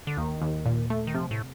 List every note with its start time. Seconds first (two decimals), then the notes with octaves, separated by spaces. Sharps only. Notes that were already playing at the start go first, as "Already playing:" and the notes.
0.07 D3
0.17 D#2 D#3
0.42 D#2
0.66 A#2
0.90 A3
1.07 D#3
1.15 C3 F3
1.31 A2